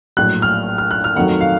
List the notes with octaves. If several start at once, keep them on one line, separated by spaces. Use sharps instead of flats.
A#1 A2 F#3 F#6
F6
F6
F#6
F6
F2 D#3 F#3 A3 F#5
F5